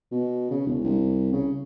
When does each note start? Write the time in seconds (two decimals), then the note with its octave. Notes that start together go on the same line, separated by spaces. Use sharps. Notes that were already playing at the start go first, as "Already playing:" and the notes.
0.12 B2
0.51 C#3
0.66 E1
0.84 C2
1.32 C#3